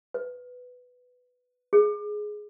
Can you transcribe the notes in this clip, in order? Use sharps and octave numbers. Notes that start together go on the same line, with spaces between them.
B4
G#4